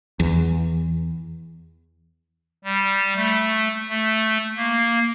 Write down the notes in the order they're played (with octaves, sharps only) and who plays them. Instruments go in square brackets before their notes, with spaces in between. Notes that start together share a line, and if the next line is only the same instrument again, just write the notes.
[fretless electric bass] E2
[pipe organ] G3
A3
A3
A#3